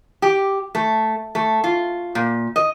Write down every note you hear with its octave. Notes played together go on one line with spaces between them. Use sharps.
G4
A3
A3
F4
A#2
D#5